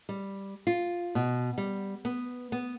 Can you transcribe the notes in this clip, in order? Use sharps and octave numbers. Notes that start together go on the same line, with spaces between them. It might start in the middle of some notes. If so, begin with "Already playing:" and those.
G3
F4
B2
G3
B3
B3